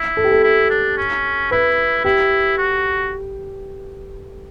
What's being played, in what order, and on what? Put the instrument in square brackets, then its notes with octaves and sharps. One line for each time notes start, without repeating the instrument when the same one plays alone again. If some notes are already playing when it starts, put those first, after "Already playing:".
Already playing: [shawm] E4
[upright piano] A4
G4
A4
[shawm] E4
D4
C#4
[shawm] E4 [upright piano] B4
[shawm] E4 [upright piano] G4
[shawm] F#4